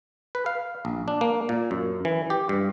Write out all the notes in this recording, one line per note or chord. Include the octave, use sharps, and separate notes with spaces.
B4
F5
A#1
D4
A#3
A#2
F#2
E3
G4
G2